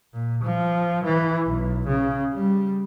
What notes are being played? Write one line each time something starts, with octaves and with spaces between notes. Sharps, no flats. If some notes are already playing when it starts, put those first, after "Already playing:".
A#2
F3
E3
B1
C#3
G3